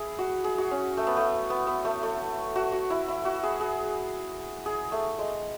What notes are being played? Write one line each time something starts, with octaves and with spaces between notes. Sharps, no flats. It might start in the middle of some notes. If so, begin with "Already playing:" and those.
Already playing: E4 G#4
F#4
G#4
F#4
C#4
A3
B3
A3
B3
B3
A3
A3
F#4
F#4
E4
E4
F#4
G#4
G#4
G#4
A3
G#3